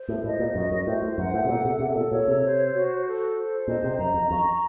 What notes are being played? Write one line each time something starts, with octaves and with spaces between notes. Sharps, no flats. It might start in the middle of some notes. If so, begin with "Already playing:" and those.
Already playing: C5
A2
A2 D#5
A#2
F#2 F#4
F#2
A2 C5
A2
F#2 F#5
A2
C3
A#2 A4
C3
C3 A4
C3
A#2
A#2 C#5
C3
C5
F#4
A4
C5
A#2 D#5
C3
F#2 A#5
F2
F2 C#6